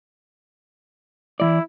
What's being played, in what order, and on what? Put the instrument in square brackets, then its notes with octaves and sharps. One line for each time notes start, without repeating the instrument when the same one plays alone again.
[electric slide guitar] E3 F3 D5 [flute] E4